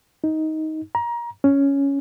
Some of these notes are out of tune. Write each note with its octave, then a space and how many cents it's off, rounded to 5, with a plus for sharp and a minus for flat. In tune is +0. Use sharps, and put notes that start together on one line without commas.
D#4 +15
A#5 +25
C#4 +5